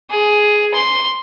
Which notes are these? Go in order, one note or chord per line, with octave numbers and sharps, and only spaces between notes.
G#4
C6